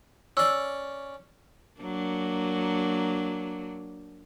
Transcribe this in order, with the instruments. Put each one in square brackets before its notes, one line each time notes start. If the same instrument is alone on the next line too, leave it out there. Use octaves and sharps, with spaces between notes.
[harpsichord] C#4 D5 [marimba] E6
[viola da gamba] F#3 A#3 D4